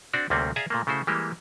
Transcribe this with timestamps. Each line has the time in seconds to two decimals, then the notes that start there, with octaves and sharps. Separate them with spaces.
0.13 C4 D4 F#4 D5
0.30 D2 C3 G3 A#3 C4 C#4
0.56 G#4 D5 E5 F5 G#5 A#5
0.70 A#2 A3 A#3
0.87 C#3 A3 E4 F#4 C5
1.07 E3 G3 G#3 A#3 G4